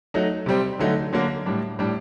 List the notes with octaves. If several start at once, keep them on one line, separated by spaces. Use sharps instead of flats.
F#3 A3 D#4
C3 G3 C4
D3 F#3 A3 D#4
D3 F#3 A#3
A2 G3 D4
A2 G3 D4